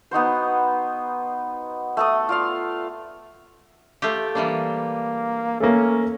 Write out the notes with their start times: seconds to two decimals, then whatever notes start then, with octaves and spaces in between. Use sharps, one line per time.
0.11 B3 D#4 F#4 C5
1.97 A3 A4 D#6
2.29 F4 D5 F5
4.02 A3 F4 G4
4.35 E3 G3 A#3 D4
5.60 A3 A#3 C#4